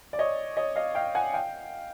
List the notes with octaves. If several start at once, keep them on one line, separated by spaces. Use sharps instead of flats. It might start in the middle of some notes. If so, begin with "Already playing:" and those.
D5
C#5 D#5
C#5 D#5
D#5 F5
F5 G5
F#5 G#5
F5 G5